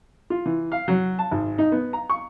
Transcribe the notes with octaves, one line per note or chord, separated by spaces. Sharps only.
F4
E3
F5
F#3
A5
G#1
D#4
B3
A#5
C#6